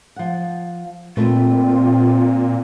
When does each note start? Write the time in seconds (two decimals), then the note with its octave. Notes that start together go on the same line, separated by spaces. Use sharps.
0.16 F3 F#5
1.17 A#2 A3 C4 F4 B4